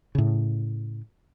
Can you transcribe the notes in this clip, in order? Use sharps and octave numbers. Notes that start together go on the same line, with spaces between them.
A2 C#3